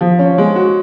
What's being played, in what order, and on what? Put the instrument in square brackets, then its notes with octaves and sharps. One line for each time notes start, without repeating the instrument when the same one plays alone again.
[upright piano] F3
C#4
G#3
F#4